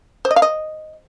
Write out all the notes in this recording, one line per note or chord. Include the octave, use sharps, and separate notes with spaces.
C5
D#5
F5
D#5